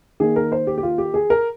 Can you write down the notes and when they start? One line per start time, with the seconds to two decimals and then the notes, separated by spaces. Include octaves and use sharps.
0.20 D#3 A#3 G#4
0.36 A#4
0.52 C5
0.67 G4
0.78 G4
0.83 F4
0.98 G4
1.14 G#4
1.30 A#4